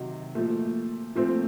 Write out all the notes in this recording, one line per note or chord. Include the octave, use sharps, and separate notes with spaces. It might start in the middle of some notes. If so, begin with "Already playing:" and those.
Already playing: C3 D#3 F#3
A#2 F3 A3
A#2 F3 A3 C4